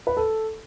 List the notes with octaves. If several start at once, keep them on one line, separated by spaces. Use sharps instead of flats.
B4
A4